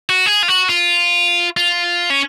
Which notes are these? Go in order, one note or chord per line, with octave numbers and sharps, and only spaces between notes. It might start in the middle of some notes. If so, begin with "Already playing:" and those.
F#4
G#4
F4
F#4
F4
F4
C#4